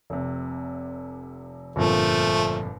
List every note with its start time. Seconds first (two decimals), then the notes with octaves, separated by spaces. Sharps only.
0.10 F1 C3
1.76 G1 F2 A#2 F3 A3